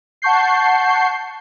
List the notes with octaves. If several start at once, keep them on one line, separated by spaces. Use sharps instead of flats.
F#5 A5 C#6 G6 C7